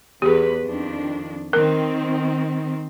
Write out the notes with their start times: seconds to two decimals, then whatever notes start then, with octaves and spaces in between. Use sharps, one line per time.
0.22 E2 G4 G#4 B4
0.66 F2 D#3 D4
1.53 D#3 C4 A#4